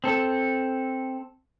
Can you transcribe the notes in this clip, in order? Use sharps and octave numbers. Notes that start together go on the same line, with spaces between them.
C4 A4